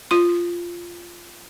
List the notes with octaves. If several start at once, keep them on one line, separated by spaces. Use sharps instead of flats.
F4 C6